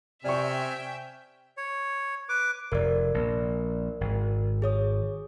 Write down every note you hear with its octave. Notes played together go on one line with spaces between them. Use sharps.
C3 C4 D5 E5 G5 G#5 C#6 F6
C#5
B4 D6
F1 A#4 D5
A#1
G#1
G#4 C#5 D#6